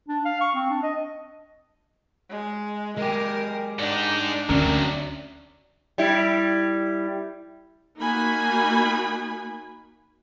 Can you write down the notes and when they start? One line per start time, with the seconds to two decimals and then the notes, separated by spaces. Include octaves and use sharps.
0.09 D4
0.25 F5
0.41 C#6
0.55 C4
0.70 D4
0.83 D#5
2.30 G#3
2.98 G#3 G4 A#4
3.79 G#2 D4 D#4
4.49 D2 C3 F#3 C#4 A#4
5.98 G3 E4
7.99 A#3 D#4 F#4 G#5 B5